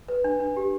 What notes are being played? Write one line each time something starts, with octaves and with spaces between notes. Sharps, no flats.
B4
D4
D4
G4